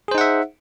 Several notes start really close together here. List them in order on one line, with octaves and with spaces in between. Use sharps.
G#4 C5 D#4 F#5 E5